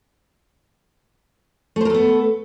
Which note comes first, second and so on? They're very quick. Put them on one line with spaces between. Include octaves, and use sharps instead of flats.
A3 C5 A#4 A4 B3